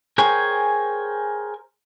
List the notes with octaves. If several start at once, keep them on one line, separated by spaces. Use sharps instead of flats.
G#4 A#4 C5 C#5 G5 G#5